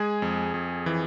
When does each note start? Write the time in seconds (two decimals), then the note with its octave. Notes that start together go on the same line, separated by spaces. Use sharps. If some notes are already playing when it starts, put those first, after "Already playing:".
Already playing: G#3 G#4 G#5
0.22 F2
0.54 F2
0.86 E3